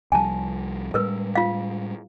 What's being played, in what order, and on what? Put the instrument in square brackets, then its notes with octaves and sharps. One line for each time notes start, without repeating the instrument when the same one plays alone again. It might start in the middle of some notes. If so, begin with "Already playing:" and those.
[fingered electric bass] C2 F3 G3 [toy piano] G#5 A5
[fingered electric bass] A2 G3 G#3 [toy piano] A#4 B4
[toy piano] F4 F5